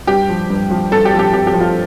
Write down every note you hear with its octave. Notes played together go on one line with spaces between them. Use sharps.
G2 G4
F3
G2
F3
G2 A4
G4
F3
G4
G2 G4
G4
F3
F4